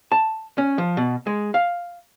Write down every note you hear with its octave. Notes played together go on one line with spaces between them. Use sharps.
A5
C#4
F3
B2
G#3
F5